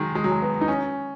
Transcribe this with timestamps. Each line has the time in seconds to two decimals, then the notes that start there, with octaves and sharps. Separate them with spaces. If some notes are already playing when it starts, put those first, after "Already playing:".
Already playing: D#3 F#3 G#3
0.15 G#3
0.24 F#3
0.32 G#3
0.42 B3
0.61 D#4
0.68 C#4